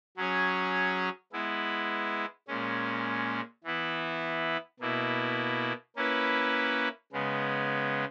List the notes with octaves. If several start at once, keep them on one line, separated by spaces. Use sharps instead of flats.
F#3 C#4 G#4 C#5
G#3 B3 E4
A#2 G#3 C#4
E3 B3 E4
B2 A#3 E4
A#3 C#4 E4 B4
C#3 G#3 B3